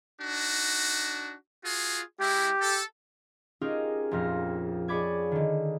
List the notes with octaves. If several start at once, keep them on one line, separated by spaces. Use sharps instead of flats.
D4 D#4 F#4
F4 F#4 G#4
G#3 E4 G4
A4
C#4 D#4 F4 G4 G#4 A#4
A#1 F2 A#2 F3 F6 A#6
G#4 C#5 D5 B5 D6 G#6
D3 D#3